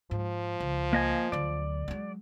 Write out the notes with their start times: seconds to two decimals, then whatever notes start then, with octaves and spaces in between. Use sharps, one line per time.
0.11 G#2 F3
0.60 C#2
0.93 A#3 D#5 G#5
1.32 D2 F#3 D5
1.88 F#3 G#3